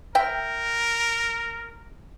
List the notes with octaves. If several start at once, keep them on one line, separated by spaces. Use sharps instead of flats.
A#4 E5 G5